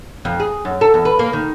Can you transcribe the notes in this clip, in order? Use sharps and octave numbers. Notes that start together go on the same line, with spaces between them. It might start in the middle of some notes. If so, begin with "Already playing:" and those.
F2
G#4
F#2
A4
E2
B4
A#3
D#3